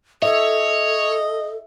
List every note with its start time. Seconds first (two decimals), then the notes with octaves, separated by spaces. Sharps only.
0.22 A4 C#5 D#5 E5